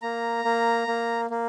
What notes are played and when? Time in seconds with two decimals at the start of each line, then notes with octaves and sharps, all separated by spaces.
0.02 A#3 A#5
0.45 A#3
0.87 A#3
1.30 A#3